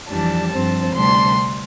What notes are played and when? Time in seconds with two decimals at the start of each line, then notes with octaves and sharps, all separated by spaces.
0.09 F2 E3 G3 D4 A5
0.52 G2 F3 C4
0.94 D2 C3 G3 D4 C6